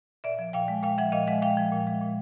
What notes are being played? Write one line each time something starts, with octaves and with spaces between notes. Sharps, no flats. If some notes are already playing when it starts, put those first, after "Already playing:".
A#2 D5 E5
F3
A#2 F5 G5
G#3
A#2 F5 G5
F3 E5 F#5
A#2 D#5 F5
G#3 E5 F#5
A#2 F5 G5
F3
A#2
G#3
A#2